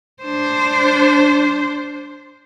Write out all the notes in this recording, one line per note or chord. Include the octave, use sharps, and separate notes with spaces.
D4 C5